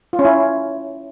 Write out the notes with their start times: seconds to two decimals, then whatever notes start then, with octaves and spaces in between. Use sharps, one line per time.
0.13 F4
0.19 C#4
0.25 E4